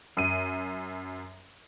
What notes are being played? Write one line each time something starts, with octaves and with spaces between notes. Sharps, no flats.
F#2 D#7